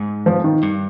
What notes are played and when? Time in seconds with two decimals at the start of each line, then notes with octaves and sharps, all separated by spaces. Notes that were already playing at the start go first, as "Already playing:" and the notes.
Already playing: G#2
0.26 F3
0.44 D#3
0.63 G2